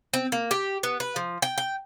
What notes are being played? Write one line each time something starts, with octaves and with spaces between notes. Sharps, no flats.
C4
A#3
G4
B3
B4
F3
G5
G5